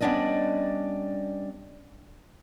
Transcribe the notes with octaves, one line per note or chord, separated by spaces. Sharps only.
G3 B3 C#4 D4 D5 D#5